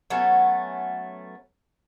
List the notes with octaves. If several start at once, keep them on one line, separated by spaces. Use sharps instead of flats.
F#3 A3 B3 C#4